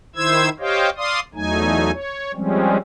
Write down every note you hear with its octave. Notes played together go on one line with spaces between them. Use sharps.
D#3 E4 C5 E6 G#6
G4 C5 C#5 D#5 F5 G5
D5 F5 C6 D#6
E2 F#3 A3 D#4 G#5
C#5
F3 G3 G#3 C4 C#4